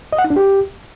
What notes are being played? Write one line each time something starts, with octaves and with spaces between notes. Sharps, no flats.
D#5
F#5
D#4
D4
G4